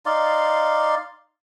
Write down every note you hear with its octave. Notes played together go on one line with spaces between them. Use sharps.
D#4 D5 F5 C6